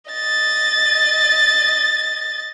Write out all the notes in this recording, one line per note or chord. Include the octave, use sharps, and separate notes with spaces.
D#5 A6